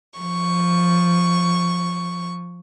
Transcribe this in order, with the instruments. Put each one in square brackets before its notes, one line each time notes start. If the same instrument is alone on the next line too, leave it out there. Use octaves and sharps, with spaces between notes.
[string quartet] F3 C#6